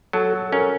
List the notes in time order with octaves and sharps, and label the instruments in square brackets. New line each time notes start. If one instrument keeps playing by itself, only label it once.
[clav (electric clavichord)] F#3 [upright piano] A4
[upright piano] A4
[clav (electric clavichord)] C#4 [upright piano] A#4